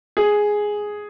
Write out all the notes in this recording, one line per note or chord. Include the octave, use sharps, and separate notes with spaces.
G#4